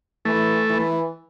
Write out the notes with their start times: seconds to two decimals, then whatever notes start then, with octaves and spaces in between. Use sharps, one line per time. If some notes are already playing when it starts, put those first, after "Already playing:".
0.25 E3 A3
0.70 E3